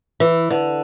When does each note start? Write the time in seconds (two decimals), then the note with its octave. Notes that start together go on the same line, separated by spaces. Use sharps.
0.20 E3
0.50 D3